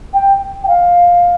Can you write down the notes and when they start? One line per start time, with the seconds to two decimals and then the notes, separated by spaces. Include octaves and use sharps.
0.14 G5
0.64 G5
0.68 F5